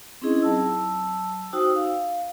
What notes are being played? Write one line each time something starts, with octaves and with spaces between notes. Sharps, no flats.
C4 C#4 D#4 E4 G#4 D#5
F#3 A5 E6
D#4 F#4 C5 G5 D#6 E6
F5